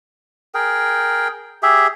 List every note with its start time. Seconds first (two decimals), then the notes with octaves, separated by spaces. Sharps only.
0.54 G#4 A#4 G5
1.63 G4 G#4 E5